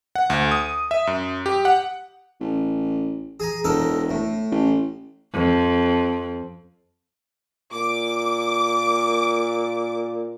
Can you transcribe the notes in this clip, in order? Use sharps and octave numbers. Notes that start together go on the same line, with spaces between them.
F#5
D2
D#6
E5
F#2
G4
F#5
A1
G#4 G#5 A#5
E1 D#4 A4 A#4
A2
A1
F2
A#2 D6